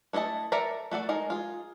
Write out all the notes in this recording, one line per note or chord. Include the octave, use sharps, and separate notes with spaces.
A3 E4 C5 D#5 A5
A4 A#4 D5 E5 A#5
A3 F#4 A4 D5
G#3 D#4 A#4
F4 G#4